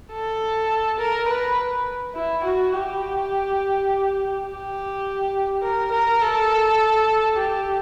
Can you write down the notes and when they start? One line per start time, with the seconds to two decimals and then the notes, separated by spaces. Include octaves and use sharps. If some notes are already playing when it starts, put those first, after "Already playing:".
0.13 A4
0.99 A#4
1.28 B4
2.15 E4
2.44 F#4
2.73 G4
4.47 G4
5.63 A#4
5.92 A#4
6.22 A4
7.37 G4